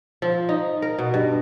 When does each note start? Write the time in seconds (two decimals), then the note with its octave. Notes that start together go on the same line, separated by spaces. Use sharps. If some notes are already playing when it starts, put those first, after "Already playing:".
0.22 F3
0.49 D#4
0.82 A#4
0.99 B2
1.14 G2